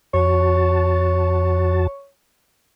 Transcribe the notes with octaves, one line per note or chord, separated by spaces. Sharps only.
F2 F#4 C#5 A5